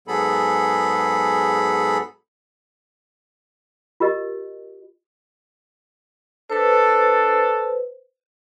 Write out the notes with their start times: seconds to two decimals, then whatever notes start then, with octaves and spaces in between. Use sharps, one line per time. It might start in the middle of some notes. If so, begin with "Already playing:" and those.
0.08 G#2 F#3 B3 G#4 A4 B5
4.00 F4 G4 A#4 D#5
6.50 D4 A4 B4 C5